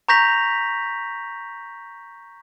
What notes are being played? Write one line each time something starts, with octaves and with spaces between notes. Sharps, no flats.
A#5 C#6 G6 A#6 B6 F7